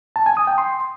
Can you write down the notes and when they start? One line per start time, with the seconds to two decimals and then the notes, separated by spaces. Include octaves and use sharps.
0.16 A5
0.26 G#5
0.37 D#6
0.47 G5
0.58 C6